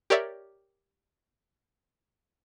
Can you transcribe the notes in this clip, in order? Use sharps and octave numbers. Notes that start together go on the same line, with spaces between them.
G4 A#4 C#5 D5 E5